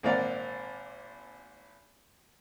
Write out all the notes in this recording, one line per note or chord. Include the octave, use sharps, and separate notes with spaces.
G#1 A#2 C4 A#4 D5 F#5